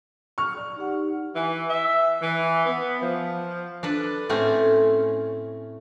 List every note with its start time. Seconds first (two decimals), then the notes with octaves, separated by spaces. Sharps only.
0.38 C#6 F6
0.57 D5
0.76 D#4 G4 F#5
1.35 E3
1.69 E5
2.21 E3
2.66 B3
3.02 F3
3.83 D4 A4 B4
4.29 A2 A3 C4 C#4